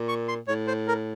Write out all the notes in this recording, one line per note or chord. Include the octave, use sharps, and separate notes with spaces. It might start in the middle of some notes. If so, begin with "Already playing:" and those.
Already playing: A#2
C#6
C6
A2 C#5
C5
A#4